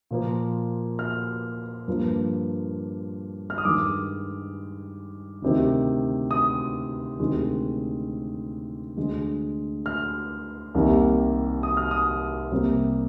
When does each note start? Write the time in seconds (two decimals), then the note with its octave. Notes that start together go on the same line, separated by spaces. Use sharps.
0.11 A#2 F3 A#3
0.99 F6
1.88 G2 F3 A#3
3.50 F6
3.58 D#6
3.65 G2 D#3 G#3 D6
5.42 D2 C3 D#3
6.31 D#6
7.19 D2 C3 D#3 G#3
8.97 D2 D3 G#3
9.86 F6
10.75 C2 C3 D#3 G3 A#3
11.63 D#6
11.77 F6
11.91 D#6
12.52 C2 C3 G3 A#3